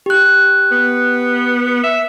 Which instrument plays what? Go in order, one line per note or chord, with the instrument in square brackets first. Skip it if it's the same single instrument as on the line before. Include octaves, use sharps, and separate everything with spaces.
[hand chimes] G4 F#6
[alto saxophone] B3
E5